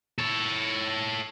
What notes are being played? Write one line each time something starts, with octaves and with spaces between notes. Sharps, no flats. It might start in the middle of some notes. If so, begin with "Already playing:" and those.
A4 C#5